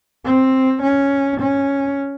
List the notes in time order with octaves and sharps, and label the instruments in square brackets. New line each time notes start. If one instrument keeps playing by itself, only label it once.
[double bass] C4
C#4
C#4